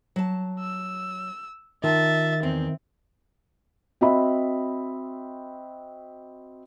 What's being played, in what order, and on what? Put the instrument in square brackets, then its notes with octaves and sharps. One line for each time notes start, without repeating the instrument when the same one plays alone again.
[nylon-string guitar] F#3 A5
[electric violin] E6
[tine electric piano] D#3 [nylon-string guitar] F4 A5 [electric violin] E5 A6
[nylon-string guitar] E2 [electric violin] C4
[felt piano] C4 F#4 D#5 E5 B5